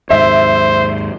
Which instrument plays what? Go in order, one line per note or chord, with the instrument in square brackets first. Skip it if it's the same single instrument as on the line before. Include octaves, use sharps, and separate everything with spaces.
[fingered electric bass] D#2 G#2 [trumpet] C5 [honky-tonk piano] E5